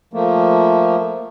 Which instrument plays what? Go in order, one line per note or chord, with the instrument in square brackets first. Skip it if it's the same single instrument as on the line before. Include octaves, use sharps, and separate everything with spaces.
[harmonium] F3 A3 A#3